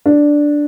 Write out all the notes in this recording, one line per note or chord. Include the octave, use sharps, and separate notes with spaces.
D4